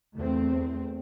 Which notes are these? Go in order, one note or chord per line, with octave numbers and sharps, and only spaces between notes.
E2 A3 C4